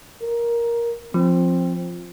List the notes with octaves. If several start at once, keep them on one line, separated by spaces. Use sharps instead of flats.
A#4
F3 C4